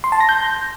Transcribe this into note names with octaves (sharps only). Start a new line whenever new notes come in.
C6
A5
A#6
G6